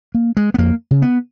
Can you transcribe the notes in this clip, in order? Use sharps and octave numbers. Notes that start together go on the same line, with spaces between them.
A#3
G#3
B3
F2 A#3
C#3
B3